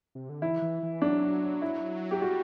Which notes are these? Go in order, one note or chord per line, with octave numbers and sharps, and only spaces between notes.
C3
D3
E3 E4
E3
E3
F#3 D4
E4
G4
G3 F#4